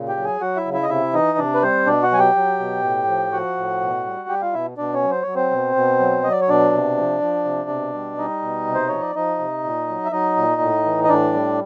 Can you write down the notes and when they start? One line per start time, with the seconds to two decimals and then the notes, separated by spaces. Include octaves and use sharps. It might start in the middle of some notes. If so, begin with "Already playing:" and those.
Already playing: A#2 C#3
0.08 G4 G5
0.17 F#3
0.24 G#4 G#5
0.41 F#3 F#4 F#5
0.56 E4 E5
0.65 C#3
0.74 E4 E5
0.83 D#5
0.89 C3 E4 E5
1.13 E3 D#4 D#5
1.38 C3 D4 D5
1.54 B4
1.62 G3 C4 C5
1.86 B2 D4 D5
2.02 F#4 F#5
2.11 F#3 G#5
2.19 G4 G5
2.36 F#3
2.59 B2
2.84 A2
3.07 F3
3.32 F3 F#4 F#5
3.57 A2
3.81 B2
4.05 G3
4.29 G3 G4 G5
4.42 F4 F5
4.54 B2 E4 E5
4.77 B2 D4 D5
4.94 C#4 C#5
5.03 F#3
5.11 C5
5.22 F#3 C#5
5.35 C4 C5
5.51 B2
5.76 B2
5.99 F#3
6.24 F#3 D#5
6.32 D5
6.41 C#5
6.48 B2 D4 D5
6.73 C3
6.97 F3
7.21 F3
7.45 C3
7.70 B2
7.94 G3
8.18 G3 D#4 D#5
8.42 B2
8.67 C3
8.74 C5
8.88 F3 C#5
9.01 D5
9.15 F3 D#4 D#5
9.39 C3
9.64 A#2
9.88 F#3
10.05 E5
10.12 F#3 D#4 D#5
10.37 A#2
10.61 A2
10.85 E3
11.04 D#5
11.09 A2 D4 D5
11.34 G3